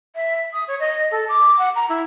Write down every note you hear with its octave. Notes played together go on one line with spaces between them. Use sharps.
E5
D#6
C#5
D#5
A4
D6
F#5
A#5
E4